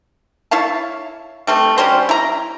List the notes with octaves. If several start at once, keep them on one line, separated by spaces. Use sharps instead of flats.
E4 C#5 F5 A5
G3 A3 C4
F#3 G3 C#4 C5
E4 A#5